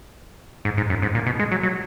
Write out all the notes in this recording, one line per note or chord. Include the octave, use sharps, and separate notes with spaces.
G#2
G#2
F#2
G#2
A#2
B2
G#3
F#3
F#3